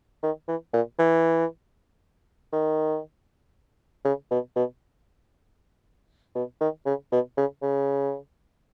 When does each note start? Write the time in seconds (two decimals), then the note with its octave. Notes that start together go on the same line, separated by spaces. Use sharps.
0.23 D#3
0.48 E3
0.73 A#2
0.99 E3
2.53 D#3
4.05 C#3
4.31 B2
4.56 B2
6.35 B2
6.61 D#3
6.86 C#3
7.12 B2
7.37 C#3
7.62 C#3